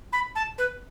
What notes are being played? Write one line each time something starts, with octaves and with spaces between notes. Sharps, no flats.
B5
A5
B4